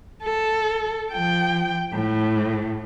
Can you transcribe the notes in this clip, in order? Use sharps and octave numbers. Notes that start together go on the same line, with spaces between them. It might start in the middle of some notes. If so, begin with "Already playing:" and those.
A4
F3 G5
A2